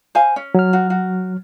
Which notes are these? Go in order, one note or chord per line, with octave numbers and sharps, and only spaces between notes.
C5 F5 G#5
C#4
F#3 F6
F#4
F#4